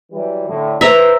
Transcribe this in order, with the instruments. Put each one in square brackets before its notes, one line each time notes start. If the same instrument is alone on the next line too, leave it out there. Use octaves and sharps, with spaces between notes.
[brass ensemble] E3 F#3 G3
A2 D3
[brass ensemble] B4 C5 [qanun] E5 A#5